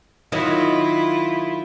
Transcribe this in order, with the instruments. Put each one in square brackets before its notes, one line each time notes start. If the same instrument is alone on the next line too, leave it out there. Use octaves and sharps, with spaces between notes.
[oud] D#3 F#3 [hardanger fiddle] E4 F4